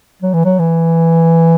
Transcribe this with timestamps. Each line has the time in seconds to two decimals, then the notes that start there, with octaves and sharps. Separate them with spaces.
0.22 F#3
0.34 E3
0.45 F#3
0.59 E3